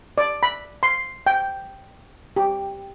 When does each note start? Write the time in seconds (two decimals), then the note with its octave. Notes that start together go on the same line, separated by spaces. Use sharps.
0.18 D5
0.43 B5
0.83 C6
1.27 G5
2.36 G4